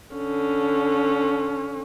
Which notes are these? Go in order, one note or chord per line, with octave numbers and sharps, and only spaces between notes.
D3 C#4